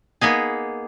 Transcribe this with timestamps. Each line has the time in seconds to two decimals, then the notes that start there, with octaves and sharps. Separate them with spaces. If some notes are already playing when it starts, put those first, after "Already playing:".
0.21 A#3 B3 D#4 G#4